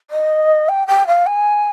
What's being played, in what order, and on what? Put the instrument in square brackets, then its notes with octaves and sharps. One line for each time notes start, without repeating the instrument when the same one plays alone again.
[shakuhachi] D#5
G5
G5
F5
G#5